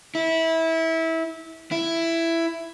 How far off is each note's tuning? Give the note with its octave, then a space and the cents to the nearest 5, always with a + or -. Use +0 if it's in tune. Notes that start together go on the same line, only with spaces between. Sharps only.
E4 -20
E4 +10